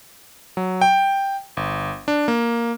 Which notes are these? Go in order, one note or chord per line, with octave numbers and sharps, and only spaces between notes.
F#3
G5
G1
D4
A#3